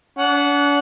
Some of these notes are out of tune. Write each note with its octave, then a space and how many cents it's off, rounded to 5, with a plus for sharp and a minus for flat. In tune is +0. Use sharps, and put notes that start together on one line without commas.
D4 -45 F#5 -10